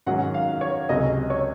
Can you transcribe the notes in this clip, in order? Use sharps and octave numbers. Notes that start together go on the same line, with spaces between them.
G#2 D#3 F#3 C#4 F#5
F5
C#5
C#2 C3 F#3 C#4 D#5
C#5